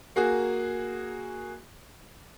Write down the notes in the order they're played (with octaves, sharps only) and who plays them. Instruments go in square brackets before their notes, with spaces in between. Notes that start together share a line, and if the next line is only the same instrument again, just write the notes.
[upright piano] A#3 F#4 G#4